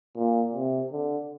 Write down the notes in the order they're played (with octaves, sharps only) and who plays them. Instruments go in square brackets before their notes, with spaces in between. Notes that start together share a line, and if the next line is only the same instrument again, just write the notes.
[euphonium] A#2
C3
D3